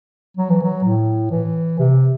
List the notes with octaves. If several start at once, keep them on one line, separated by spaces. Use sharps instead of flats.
F#3
E3
F#3
A2
E3
C3